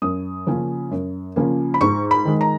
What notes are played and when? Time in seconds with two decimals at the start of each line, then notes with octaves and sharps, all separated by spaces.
0.02 F#2 D#6
0.47 C#3 F3 A#3 C#4
0.91 F#2
1.36 C#3 F3 A#3 C#4
1.74 B5
1.81 G#2 C#6
2.11 B5
2.25 D#3 G#3
2.41 A#5